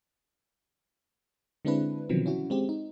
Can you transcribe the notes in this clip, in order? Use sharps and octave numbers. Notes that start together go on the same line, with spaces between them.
D3 G#3 C4 D4 E4 B4
B2 D3 D#3 F3 F#3 C4
C#4 E4 F#4
G#3 C4 G4
D#4